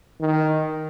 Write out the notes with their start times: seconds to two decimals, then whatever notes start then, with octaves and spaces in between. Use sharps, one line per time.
0.21 D#3